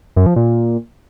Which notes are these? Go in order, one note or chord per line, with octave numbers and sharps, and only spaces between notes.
F#2
F3
A#2